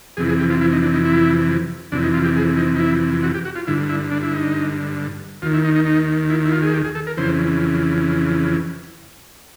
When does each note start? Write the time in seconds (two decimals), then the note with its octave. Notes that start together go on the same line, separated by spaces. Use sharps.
0.17 F2 C3 E3 G#4
0.29 G#4
0.39 G4
0.50 F4
0.61 E4
0.72 D#4
0.83 D4
0.93 D#4
1.05 E4
1.92 F2 C3 E3 D4
2.03 D#4
2.14 F4
2.25 G4
2.36 G#4
2.57 D#4
2.75 D#4
2.80 E4
3.23 F#4
3.34 G4
3.45 F#4
3.56 F4
3.67 G2 D3 E4
3.89 E4
4.11 D4
4.23 E4
4.33 D#4
5.42 D#2 F4
5.46 D#3
5.54 E4
5.65 D#4
5.75 D#4
5.85 D#4
6.30 E4
6.45 E4
6.52 F4
6.62 G#4
6.74 G4
6.84 G#4
6.95 A4
7.07 A#4
7.17 F2 C#3 E3 C5